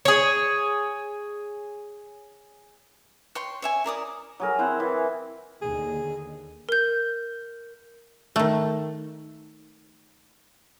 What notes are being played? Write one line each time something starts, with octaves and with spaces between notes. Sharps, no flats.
G#4 C#5
C#5 G5 C6
C#5 E5 G#5
E4 A#4 D5 D#6
F#3 G#4 A#4
C4 E4 C5 F#5
E3
D#2 D3 G#4
A#4 G6
D#3 A3